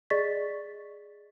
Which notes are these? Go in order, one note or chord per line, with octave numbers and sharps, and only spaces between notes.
G#4 D5 D#5 C#6 A6 B6